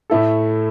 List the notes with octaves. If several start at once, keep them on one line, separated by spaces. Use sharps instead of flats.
A2 A3 E4 A4